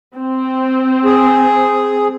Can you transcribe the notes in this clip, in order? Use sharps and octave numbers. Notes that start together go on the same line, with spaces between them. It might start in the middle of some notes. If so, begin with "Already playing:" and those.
C4
G#4